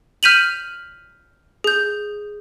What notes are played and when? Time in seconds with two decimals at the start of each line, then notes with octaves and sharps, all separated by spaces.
0.23 F6 G6 B6 D#7 F7 F#7
1.64 G#4 G6